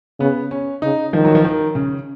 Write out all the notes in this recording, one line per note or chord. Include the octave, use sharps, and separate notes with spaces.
C#3 B3
C#4
C#3 D#4
D#3 F3
F#3
F3
D#3
C#3